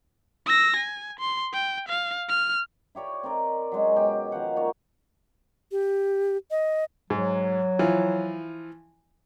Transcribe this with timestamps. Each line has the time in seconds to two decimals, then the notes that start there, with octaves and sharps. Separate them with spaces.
0.46 E6 A#6
0.77 G#5
1.19 C6
1.53 G5
1.88 F5
2.29 F6
2.95 E4 G4 C#5 D5
3.23 C4 A#4 D5 D#5
3.72 F#3 G#3 C#4
3.96 B2 G4 G#4
4.32 D#3 F3 F5 F#5
4.56 A#3 C#5 D5
5.72 G4
6.51 D#5
7.10 G#2 F#3
7.79 E3 F3 F4